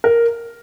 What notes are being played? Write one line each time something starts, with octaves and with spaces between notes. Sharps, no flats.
A#4